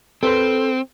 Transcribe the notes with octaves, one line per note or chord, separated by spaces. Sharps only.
C4 A4 B4 C5